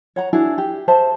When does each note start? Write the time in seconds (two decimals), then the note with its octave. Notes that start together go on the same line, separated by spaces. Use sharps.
0.16 C#5 F#5 A#5
0.33 D4 E4 F#4 G#4
0.58 G4
0.88 G#4 C5 E5 A5